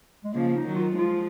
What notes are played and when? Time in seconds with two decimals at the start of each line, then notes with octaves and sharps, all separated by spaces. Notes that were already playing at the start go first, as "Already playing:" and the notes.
0.24 G#3
0.34 C#3 F3 A#3
0.56 D#4
0.66 D#3 F#3
0.76 F4
0.97 F3 G#3 F4